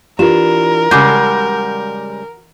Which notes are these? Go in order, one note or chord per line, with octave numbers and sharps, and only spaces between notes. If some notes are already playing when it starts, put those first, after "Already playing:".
E3 D4 F4 G4 A#4 E7
C#3 G3 G#3 F#4 D6 G6